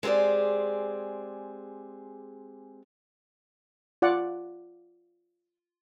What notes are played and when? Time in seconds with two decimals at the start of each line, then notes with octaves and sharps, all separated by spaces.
0.03 G#3 C4 G4 G#4 D5
4.02 F4 D5 F#5